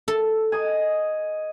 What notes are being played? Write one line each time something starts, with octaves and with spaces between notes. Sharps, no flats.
A4
D#5 G#5